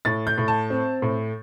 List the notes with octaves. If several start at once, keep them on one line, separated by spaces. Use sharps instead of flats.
A2 A6
G6
A2
A5
C4
A2